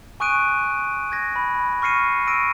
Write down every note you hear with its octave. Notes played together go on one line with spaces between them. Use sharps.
G#5 C#6 D#6 F#6 D7 D#7
G#6 A#6
B5
C#6 F6 A#6 C7 C#7 D#7
C#6 E6 A#6 D7 D#7